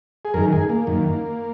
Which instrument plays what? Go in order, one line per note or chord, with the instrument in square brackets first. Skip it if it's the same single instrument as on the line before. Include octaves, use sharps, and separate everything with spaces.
[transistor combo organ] G#4
F#2 D#3 A#4
G#4
A#3
F#2 D#3